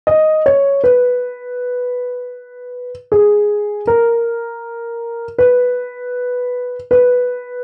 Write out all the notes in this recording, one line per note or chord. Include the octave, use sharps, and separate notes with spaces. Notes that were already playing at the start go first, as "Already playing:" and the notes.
D#5
C#5
B4
G#4
A#4
B4
B4